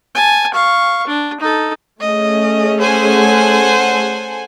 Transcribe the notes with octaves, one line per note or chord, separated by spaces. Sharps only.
G#5 A5
F5 C#6
D4
D#4 A4
A3 C#4 G#4 D#5
A4 C5 F#5 G#5